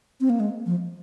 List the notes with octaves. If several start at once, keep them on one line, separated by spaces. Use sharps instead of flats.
C4
A#3
G#3
F3